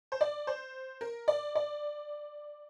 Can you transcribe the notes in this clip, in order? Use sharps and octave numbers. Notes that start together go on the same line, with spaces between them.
C5
D5
C5
A#4
D5
D5